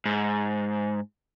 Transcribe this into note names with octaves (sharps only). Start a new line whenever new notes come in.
G#2